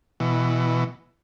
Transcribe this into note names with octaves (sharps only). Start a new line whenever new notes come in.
B2 E3